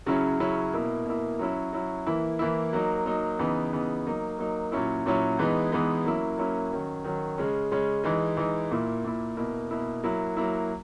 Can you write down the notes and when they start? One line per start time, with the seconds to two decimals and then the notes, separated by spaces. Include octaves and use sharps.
0.06 C#3 F#3 C#4 E4
0.40 C#3 F#3 C#4 E4
0.74 B2 A#3 E4
1.06 B2 A#3 E4
1.39 F#3 C#4 E4
1.73 F#3 C#4 E4
2.06 E3 A#3 E4
2.39 E3 A#3 E4
2.73 F#3 A#3 D#4
3.06 F#3 A#3 D#4
3.39 C#3 E3 B3 D#4
3.73 C#3 E3 B3 D#4
4.06 F#3 A#3 D#4
4.38 F#3 A#3 D#4
4.72 A#2 F#3 C#4 E4
5.06 A#2 F#3 C#4 E4
5.39 E3 G#3 B3 D#4
5.72 E3 G#3 B3 D#4
6.04 F#3 A#3 C#4 E4
6.38 F#3 A#3 C#4 E4
6.71 D#3 F#3 C#4
7.04 D#3 F#3 C#4
7.38 C#3 G#3 C#4
7.71 C#3 G#3 C#4
8.04 E3 G#3 D#4
8.37 E3 G#3 D#4
8.71 A#2 A#3 E4
9.04 A#2 A#3 E4
9.37 B2 A#3 E4
9.71 B2 A#3 E4
10.04 F#3 A#3 E4
10.37 F#3 A#3 E4